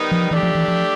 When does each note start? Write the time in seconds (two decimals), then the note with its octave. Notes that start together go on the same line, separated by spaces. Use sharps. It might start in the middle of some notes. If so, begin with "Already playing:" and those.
Already playing: D#3 G3 B3 D#4
0.11 F3
0.30 E3 A3 D4 G4
0.43 F3
0.55 E3
0.68 F3